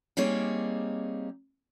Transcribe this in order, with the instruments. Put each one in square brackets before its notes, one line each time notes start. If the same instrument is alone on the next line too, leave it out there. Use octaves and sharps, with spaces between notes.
[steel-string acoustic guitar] G3 A#3 C4 D#4 G#4 C#5